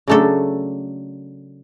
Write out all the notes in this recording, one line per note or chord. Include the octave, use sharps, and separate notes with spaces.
C#3 F#3 A3 D4 A4